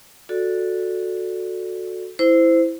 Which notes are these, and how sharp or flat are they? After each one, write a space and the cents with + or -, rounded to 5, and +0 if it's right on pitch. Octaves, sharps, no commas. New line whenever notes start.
F#4 -15 A4 +0 D5 +0
E4 +0 C5 -15